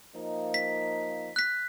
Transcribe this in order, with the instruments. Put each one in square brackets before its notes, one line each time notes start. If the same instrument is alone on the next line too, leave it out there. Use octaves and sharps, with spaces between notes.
[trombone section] F3 A#3 D#4
[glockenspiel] B6
F#6 B6